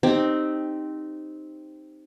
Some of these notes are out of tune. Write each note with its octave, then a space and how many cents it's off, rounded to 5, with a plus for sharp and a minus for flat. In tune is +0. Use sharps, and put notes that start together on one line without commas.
C4 +0 D#4 -10 G4 +10